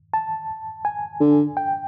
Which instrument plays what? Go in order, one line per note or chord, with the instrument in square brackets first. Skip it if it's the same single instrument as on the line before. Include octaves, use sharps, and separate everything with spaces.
[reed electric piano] A5
G#5
[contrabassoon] D3
[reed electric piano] G5